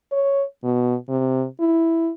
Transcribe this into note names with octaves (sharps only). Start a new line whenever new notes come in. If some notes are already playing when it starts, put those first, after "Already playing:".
C#5
B2
C3
E4